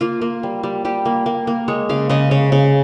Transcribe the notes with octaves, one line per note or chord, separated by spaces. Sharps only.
A#3 F4
A#3
G3
G3
G3 G4
A#3
A#3
A#3
G#3 C#5
C#3 F5
C#3 D#5
C#3 C#5
C#3